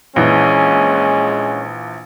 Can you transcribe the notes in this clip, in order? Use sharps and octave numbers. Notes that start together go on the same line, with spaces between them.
A#1 E3 G#3 C#4